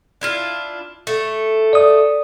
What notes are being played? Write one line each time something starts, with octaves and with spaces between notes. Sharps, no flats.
D4 E4 F4
A3
D5 D#6